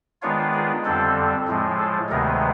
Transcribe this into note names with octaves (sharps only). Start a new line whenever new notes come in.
D#3 G#3 B3 D4 F4 C#5
G#4
F2 D3 G3 C4 A4
A2 F3 G#3
A4
D2 C3 D#3 G#3 B3 A#4